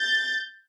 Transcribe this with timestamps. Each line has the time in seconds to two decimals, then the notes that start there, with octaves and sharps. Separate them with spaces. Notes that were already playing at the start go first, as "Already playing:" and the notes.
Already playing: G6 A6